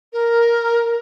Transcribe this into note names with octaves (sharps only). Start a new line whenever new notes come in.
A#4